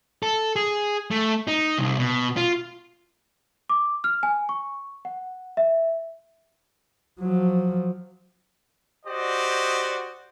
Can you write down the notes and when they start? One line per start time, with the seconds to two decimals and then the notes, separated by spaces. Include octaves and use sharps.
0.23 A4
0.56 G#4
1.11 A3
1.48 D#4
1.78 C2
1.98 B2
2.37 F4
3.70 D6
4.04 F6
4.23 G#5
4.49 C#6
5.05 F#5
5.57 E5
7.20 F3 F#3
9.06 F#4 G4 C5 D5 D#5